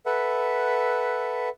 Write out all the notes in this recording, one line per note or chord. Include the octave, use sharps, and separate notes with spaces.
A4 B4 E5 F#5